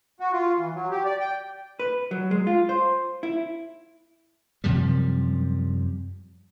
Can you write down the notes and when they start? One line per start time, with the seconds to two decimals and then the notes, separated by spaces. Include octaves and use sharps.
0.20 F#4
0.33 F4
0.59 E3
0.75 F#3
0.91 G4
1.05 D5
1.20 G5
1.80 B4
2.11 F#3
2.31 G#3
2.47 F4
2.69 C5
3.23 E4
4.64 F#2 C3 F3 G3